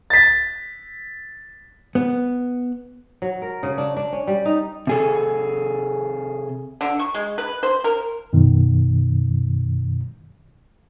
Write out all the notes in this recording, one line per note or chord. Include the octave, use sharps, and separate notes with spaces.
A6 B6
B3
F#3
A#4
C#3
D4
D4
C#4
G3
D#4
C3 G#4 A4
D3
C#6
G#3
B4
C5
A#4
F#2 B2 D#3